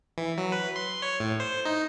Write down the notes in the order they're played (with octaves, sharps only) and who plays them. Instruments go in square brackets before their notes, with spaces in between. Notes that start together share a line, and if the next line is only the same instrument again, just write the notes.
[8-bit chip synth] E3
F#3
B4
C6
C#5
A2
C5
D#4